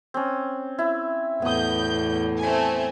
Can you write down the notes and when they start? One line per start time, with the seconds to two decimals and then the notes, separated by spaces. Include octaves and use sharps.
0.14 C4 C#4
0.79 E4
1.42 E2 A2 B3 B4 D#6 G6
2.39 A3 C4 G#5